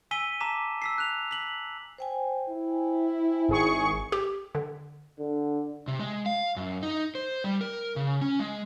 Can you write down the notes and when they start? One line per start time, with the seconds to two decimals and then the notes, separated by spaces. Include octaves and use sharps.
0.11 G#5 E6 B6 D#7 G7
0.40 A5 A#5 D6 B6 E7
0.82 E6 B6 C7
0.98 F#6 F7
1.31 B6 F#7
1.98 C5 G5 G#5
2.49 E4
3.48 G#1 G#4 C#6
4.12 G4
4.55 D3
5.19 D3
5.88 C3
5.99 G#3
6.26 F5
6.56 F#2
6.83 D#4
7.15 C5
7.44 G3
7.61 A#4
7.96 C#3
8.21 C#4
8.39 G#3